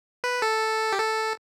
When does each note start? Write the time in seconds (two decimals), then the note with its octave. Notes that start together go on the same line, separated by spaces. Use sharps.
0.24 B4
0.42 A4
0.93 G4
0.99 A4